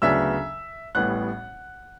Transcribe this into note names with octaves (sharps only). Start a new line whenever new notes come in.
D2 C#3 F#3 B3 D4 E5 E6
A1 A2 G3 B3 F#5 F#6